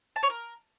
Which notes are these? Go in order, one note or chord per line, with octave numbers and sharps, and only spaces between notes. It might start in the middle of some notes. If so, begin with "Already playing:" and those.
A5
C#5
A#4